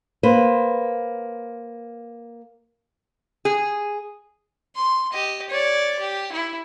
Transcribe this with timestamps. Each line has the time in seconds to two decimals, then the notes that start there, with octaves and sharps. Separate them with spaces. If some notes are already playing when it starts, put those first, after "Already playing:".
0.23 A#3 B4 C5
3.45 G#4
4.76 C6
5.13 G4 D#5
5.50 C#5 D5
5.99 G4
6.32 E4